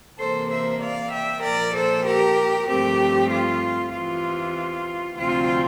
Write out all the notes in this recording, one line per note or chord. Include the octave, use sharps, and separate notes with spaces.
C3 E3 A#3 A4 C5
C5 E5
D5 F5
E5 G5
A#2 F3 A#3 A#4 D5
A4 C5
G4 A#4
G2 F3 A3 C4 G4
F4
E2 C3 E3 F4
D2 C3 F3 C4 F4